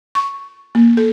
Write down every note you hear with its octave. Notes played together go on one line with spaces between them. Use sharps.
C#6
A#3
A4